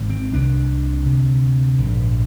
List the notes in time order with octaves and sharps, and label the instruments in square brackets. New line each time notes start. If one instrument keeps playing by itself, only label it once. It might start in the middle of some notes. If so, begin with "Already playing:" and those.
Already playing: [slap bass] G#1 G#2
C4
C2 C3 D4
D2 C3
A#1 G#2